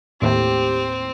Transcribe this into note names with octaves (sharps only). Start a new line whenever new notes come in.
D#2 A2 C4 G4